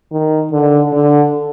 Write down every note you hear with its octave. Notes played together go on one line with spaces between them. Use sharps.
D#3
D3
D3